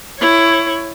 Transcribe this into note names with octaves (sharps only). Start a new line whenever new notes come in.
E4 C#5